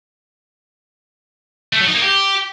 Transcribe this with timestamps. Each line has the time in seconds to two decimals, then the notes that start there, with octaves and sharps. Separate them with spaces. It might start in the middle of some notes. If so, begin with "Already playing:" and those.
1.73 A3
1.80 F#3
1.87 D#4
1.95 A#3
2.02 G4